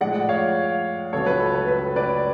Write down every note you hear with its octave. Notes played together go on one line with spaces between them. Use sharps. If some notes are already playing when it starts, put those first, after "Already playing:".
A2 F3 G#3 D5 F#5
C#5 F5
C#2 C#3 F#3 A4 C#5
B4
A4
B4
B4
B4 D5